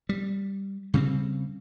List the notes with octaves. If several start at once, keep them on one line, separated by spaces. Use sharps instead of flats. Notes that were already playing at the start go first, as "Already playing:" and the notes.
G3
C#3 G3 B3 C4